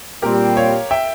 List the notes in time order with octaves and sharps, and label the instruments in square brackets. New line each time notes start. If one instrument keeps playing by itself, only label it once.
[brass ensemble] A#2 G3 C4 [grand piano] G4 A#4
[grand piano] C#5 F5
E5 G5